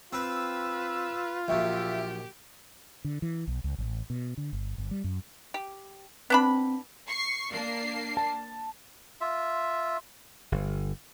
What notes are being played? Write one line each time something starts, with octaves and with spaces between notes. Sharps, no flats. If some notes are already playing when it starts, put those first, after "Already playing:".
C4 F4 B4 E6
A#1 F#2 G4 E5
D3
E3
B1
C#2
A1
B2
D3
G1
G1
G3
F#2
G4
B3 C4 D4 B5
C#6 C7
A#3 D4 C7
A5
F4 E5
G1